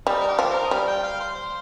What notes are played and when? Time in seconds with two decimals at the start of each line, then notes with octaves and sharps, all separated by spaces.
0.07 G3 D#4
0.21 A#4
0.28 G4
0.39 F3
0.50 A#4
0.63 D#5
0.71 G3 F5
0.87 G5
1.03 F5
1.20 C5
1.36 C5